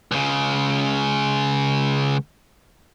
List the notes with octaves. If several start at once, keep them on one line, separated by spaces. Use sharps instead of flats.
C#2 C#3